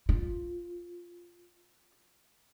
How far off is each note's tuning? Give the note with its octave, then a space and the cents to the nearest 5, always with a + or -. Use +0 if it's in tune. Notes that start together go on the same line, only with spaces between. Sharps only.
F4 +0